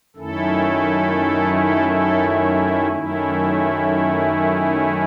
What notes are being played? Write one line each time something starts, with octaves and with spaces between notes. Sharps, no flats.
F#2 D#3 A3 C#4 E4 A4
A4
A4
F#2 D#3 A3 C#4 E4